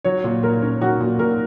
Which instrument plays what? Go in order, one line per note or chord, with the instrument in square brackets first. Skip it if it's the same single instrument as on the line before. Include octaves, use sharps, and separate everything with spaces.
[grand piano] F#3 [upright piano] C#5
[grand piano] A#2
[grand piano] A#2 [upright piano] A#4
[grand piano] C#4
[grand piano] F#3 [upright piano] F#4
[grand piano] A#2
[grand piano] A#2 [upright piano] A#4